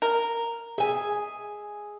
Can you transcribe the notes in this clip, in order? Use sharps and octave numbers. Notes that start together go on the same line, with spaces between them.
A#4
G#4 E5 G#5